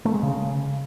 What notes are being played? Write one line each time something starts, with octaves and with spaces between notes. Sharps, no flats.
A3
G#3
C#3